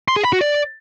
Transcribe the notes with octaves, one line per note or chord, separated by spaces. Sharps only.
C6
G#4
B5
F#4
D5